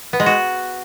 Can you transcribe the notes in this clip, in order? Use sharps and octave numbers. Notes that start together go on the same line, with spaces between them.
B3
G#3
F#4